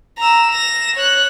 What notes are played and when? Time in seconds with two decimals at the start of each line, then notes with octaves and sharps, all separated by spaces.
0.19 A#5 E6
0.52 A#6 E7
0.96 C#5 F#6